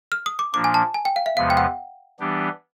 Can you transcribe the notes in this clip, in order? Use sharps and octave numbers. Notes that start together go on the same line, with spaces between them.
F6
D#6
D6
A#2 F3 A#3 D4 D6
G#5
A5
G#5
G5
F5
E5
E2 C3 F3 G#3 B3 F5
G5
F#5
E3 G3 B3 D4 G4